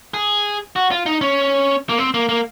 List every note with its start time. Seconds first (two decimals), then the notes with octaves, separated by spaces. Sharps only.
0.14 G#4
0.76 F#4
0.91 F4
1.06 D#4
1.21 C#4
1.89 A#3
1.98 C4
2.14 A#3
2.29 A#3